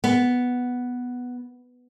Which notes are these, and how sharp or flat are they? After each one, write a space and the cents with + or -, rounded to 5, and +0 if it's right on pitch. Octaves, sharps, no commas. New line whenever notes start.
B3 +0